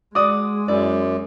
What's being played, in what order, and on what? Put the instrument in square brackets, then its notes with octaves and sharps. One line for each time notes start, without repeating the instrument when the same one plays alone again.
[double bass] G#3 [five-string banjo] F#4 D5 [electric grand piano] D6 D#6
[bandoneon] F#2 [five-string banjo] E4 D5